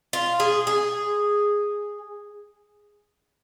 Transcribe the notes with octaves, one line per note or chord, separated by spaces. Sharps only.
F4
G#4
G#4